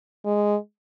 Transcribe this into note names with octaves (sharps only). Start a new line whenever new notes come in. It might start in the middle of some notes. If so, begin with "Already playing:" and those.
G#3